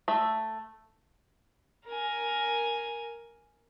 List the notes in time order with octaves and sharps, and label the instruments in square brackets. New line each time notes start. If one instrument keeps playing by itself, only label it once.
[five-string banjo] A3 E5
[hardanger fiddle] A#4 G#5